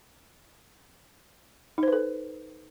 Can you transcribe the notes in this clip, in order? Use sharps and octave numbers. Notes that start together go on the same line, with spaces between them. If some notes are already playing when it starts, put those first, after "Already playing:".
D#4 A4 B4 C5